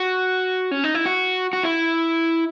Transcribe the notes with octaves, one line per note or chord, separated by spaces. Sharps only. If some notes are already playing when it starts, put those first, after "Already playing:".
Already playing: F#4
C#4
D#4
E4
F#4
F#4
E4